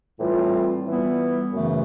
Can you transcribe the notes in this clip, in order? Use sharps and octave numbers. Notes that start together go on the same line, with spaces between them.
A2 E3 G3 C4 F4
E3 G3 B3 E4
F#2 C#3 E3 A3